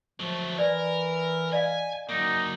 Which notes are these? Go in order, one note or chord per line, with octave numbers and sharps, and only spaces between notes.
F3 F#3 A3
E3 A#4 D5
D5 D#5 F5 G#5
F#3 A#3 D#4